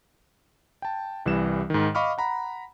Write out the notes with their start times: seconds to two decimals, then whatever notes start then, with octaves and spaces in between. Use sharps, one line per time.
0.82 G5 A5
1.26 C2 E3 G3 E7
1.70 G#2 D#3
1.95 D#5 F5 B5 C#6 D6 F6
2.18 F#5 A#5 B5